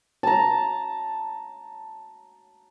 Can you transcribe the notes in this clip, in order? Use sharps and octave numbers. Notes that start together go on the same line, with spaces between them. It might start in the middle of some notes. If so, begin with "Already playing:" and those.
A5 A#5